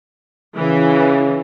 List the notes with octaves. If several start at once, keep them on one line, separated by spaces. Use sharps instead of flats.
C#3 E3